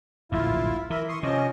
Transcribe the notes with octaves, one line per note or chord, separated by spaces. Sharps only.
D1 A#1 G2 E4 F4
E3 A#4 E5
C6 C#6 D#6
C3 F3 C#4 D#5